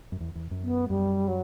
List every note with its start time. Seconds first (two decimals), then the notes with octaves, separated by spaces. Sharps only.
0.12 F#2
0.20 E2
0.35 E2
0.51 F#2
0.63 B3
0.89 F#2 G3
1.28 F#3